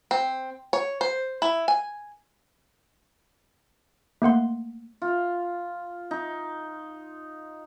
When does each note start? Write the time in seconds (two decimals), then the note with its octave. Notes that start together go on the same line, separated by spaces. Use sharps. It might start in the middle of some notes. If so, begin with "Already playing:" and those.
0.11 C4
0.73 C#5
1.01 C5
1.42 E4
1.68 G#5
4.22 A3 A#3 F#5 C6
5.02 F4
6.11 D#4